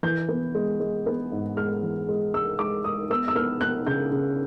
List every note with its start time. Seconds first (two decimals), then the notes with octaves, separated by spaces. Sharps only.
0.03 E3 G6
0.28 B3
0.55 G#3
0.80 G#3
1.06 B3
1.32 G#2
1.57 G#3 F6
1.83 E3
2.09 G#3
2.34 G#3 E6
2.59 G#3 D6
2.84 G#3 D#6
3.10 B3 E6
3.28 E6
3.35 B3 F6
3.61 B3 F#6
3.87 C#3 G6
4.12 C#3